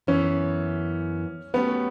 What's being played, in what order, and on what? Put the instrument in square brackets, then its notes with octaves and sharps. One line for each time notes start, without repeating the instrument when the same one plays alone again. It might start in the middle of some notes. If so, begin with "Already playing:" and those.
[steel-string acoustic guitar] F#2 E3 B3 [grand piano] C#4
[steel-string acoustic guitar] F#3 A3 C#4 G4 B4 [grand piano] B3